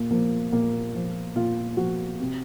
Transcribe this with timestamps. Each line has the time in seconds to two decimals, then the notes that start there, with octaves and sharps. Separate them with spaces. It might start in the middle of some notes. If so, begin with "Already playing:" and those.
Already playing: A#2 A#3
0.11 F3 A#3
0.52 A#2 A#3
0.95 F3
1.36 A#2 F4
1.77 F3 F#4
2.20 C3